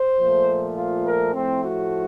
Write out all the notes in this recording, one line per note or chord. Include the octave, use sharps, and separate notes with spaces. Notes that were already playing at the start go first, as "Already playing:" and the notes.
Already playing: C5
A#2 F3 A3
F4
A#4
A2 F3 A3 C4
F#4